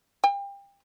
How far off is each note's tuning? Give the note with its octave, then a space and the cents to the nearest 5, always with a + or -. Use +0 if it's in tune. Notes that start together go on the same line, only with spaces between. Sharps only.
G5 +30